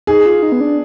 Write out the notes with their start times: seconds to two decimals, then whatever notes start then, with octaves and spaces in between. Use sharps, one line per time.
0.07 D#4 G#4
0.26 F4
0.43 D#4
0.52 B3
0.61 D4